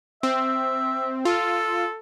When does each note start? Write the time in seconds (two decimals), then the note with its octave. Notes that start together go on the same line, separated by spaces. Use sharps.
0.23 C4 E5
1.25 F4 A4